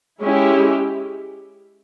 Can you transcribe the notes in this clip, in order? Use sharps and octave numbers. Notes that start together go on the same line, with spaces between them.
G#3 C#4 E4 G4